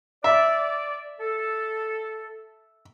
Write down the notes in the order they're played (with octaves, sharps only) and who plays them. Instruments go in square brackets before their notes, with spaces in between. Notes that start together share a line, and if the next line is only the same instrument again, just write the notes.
[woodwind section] D5 [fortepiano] E5
[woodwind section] A4